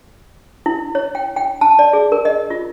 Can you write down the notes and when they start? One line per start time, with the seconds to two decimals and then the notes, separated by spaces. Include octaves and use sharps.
0.66 E4
0.95 C#5
1.15 G5
1.36 G5
1.61 A5
1.79 D5
1.93 G#4
2.12 A#4
2.25 D#5
2.50 F4